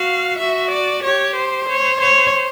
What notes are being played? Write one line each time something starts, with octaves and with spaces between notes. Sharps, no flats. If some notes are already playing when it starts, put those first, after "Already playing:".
Already playing: F#4 F5
F#4 E5
D5
G4 C#5
C5
C#5
C#5